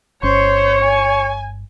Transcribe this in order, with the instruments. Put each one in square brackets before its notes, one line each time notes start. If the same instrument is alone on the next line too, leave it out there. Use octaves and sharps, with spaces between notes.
[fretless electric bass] G1 C#4 [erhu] C5 [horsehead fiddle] C#5 [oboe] C#6
[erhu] G#5